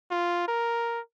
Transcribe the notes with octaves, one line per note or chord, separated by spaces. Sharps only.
F4
A#4